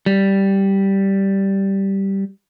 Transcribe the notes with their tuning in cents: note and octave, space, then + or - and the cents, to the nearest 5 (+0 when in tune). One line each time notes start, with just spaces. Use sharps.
G3 -5